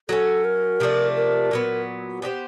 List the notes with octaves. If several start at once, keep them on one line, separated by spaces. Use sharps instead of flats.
F#3 A3 C#4 A4
A#4
C3 F3 A3 D4
A#4
A#2 F#3 B3
B3 D4 G4 C5